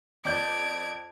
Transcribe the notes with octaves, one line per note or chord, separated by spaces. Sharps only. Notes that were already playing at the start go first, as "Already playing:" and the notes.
F2 D5 G6 G#6 D7